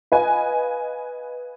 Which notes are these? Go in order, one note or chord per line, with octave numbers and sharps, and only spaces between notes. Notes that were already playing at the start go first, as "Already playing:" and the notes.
B4 D#5 F5 G#5